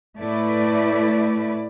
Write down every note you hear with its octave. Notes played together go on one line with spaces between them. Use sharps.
A2 A3 E4 B4 D5